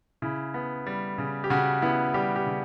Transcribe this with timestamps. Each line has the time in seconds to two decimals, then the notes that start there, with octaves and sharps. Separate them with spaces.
0.22 C#3 E4
0.54 B3
0.86 G3
1.18 C#3
1.44 G4
1.50 C#3 F#4
1.82 B3 E4
2.14 G3 G4
2.36 G4
2.46 C#3